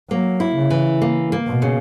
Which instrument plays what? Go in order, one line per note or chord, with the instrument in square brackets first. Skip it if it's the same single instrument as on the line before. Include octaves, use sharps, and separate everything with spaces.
[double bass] F#3 [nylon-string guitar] A#3
[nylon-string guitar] E4
[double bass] C#3
[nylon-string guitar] E3
A#3
A#3
[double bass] B2
[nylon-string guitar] C#3